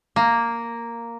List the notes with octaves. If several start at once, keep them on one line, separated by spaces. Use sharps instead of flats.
A#3